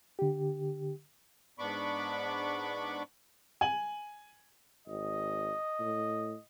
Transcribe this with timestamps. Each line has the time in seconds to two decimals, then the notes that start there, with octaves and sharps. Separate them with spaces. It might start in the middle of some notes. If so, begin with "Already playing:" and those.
0.19 D3 G4
1.59 G#2 B3 D4 B5 C#6 D6
3.61 G#5 F#7
4.88 G#1 D#5
5.80 A2